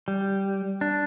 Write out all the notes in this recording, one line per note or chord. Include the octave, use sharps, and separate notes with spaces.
G3
D4